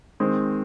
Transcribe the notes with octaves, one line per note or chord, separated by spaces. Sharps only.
D#3 G#3 C4